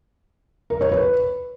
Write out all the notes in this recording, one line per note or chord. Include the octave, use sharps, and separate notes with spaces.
A#4
C#5
B4